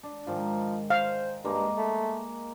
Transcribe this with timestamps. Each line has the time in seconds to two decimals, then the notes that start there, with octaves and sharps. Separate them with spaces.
0.03 D4
0.27 G#2 D#3 F3
0.90 C5 F5
1.45 G2 G#3 A#3 D#5
1.78 A3